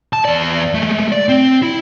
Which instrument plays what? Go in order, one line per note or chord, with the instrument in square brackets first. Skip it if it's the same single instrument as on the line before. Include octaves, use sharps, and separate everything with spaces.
[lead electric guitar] A5
E2 D5
G#3 A3
D5
C4
E4